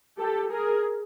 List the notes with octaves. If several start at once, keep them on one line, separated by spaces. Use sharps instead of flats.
G4 A4
G#4 A#4